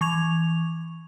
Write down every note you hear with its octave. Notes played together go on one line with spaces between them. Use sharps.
E3 C#6 G#6 F7